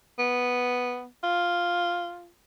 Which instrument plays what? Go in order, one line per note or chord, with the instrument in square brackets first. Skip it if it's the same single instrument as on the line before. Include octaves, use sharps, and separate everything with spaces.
[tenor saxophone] B3
F4